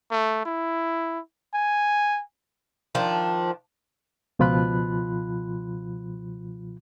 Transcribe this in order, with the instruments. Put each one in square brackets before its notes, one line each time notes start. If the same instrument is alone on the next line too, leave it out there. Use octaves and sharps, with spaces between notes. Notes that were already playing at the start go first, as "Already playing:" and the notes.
[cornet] A3
E4
G#5
[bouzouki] D#3 F3 D4
[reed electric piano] C#2 B2 F3 F4 B5 F#6